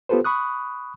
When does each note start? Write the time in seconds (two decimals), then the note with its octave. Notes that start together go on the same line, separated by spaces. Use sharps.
0.09 B3 F4 G4 A4 B4 C5
0.24 B5 C#6 D#6 F#6